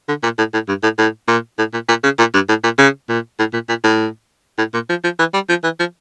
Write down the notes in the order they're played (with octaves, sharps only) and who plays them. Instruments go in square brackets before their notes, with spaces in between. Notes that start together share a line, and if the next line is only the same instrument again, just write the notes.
[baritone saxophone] D3
A#2
A2
A2
G2
A2
A2
A#2
A2
A#2
A#2
C#3
A#2
G2
A2
A#2
C#3
A#2
A2
A#2
A#2
A2
A2
A#2
F3
F3
E3
G3
F3
E3
F3